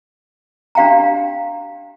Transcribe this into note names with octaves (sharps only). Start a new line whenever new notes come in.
D4 G4 F5 G5 A#5